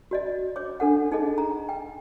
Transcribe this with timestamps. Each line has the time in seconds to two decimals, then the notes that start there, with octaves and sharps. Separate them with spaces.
0.11 F#4 D5 D#5
0.56 C#5 D6
0.80 D4 A4 F#5
1.12 D#4 G#4 A4 D#5
1.38 A#5
1.69 G5